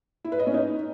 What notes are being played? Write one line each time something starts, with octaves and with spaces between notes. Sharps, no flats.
E4
B4
D#5
C#4
D#4